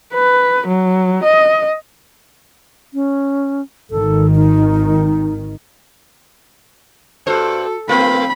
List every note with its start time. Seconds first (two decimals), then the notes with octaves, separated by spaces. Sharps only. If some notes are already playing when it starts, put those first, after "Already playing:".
0.14 B4
0.68 F#3
1.23 D#5
2.94 C#4
3.91 G#1 D#3 A4
4.35 D#4
7.27 G2 F#4 A4 C5
7.89 A3 C4 F4 B4 B5